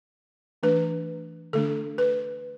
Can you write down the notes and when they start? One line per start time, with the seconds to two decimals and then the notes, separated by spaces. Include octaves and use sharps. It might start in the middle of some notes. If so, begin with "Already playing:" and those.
0.63 E3 A3 D4 B4
1.53 D3 A3 D4 A4
1.98 B4